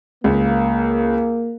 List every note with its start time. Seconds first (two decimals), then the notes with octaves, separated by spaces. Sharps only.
0.24 C#2 A#3